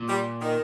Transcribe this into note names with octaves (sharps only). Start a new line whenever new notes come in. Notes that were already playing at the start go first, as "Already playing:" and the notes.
Already playing: A#2
G3
D#3